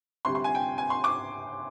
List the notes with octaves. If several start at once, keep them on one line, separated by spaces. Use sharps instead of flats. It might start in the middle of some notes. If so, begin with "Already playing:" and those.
D2 C3 G3 C6
C6
G#5
G5
G#5
C6
D6